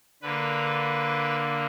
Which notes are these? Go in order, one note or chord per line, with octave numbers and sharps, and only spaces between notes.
D3 A#3 B4